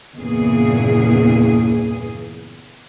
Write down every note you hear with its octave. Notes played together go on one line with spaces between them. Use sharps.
E2 G2 A#2 C#3 G#4